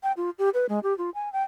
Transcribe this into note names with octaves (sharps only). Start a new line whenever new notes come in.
G5
F4
G4
B4
G#3
G4
F4
G#5
G5